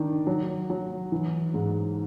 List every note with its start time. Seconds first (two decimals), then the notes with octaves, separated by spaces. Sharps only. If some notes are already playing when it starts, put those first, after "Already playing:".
Already playing: D#3 D4
0.27 F#3
0.70 F#3
1.12 E3
1.54 G#2